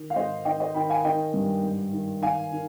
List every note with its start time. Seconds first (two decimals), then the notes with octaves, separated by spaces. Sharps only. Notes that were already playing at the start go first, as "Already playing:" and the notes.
Already playing: D#3
0.10 F5
0.16 G#2 C5 D#5
0.45 D#3 D#5 G5
0.60 C5 D#5
0.74 D#3 G5 B5
0.89 F5 G#5
1.04 D#3 D#5 G5
1.34 G2
1.63 G#2
1.93 D#3
2.22 D#3 F5 G#5
2.52 D#3